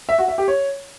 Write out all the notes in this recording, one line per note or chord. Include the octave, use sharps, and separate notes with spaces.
E5
F#4
E5
G4
C#5